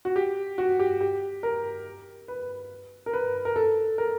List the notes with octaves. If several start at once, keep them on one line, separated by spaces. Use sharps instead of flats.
F#4
G4
F#4
G4
G4
A#4
B4
A#4
B4
A#4
A4
A#4